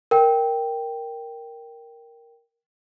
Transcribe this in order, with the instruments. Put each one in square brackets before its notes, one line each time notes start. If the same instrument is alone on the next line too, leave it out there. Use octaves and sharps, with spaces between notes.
[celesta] A#4 G5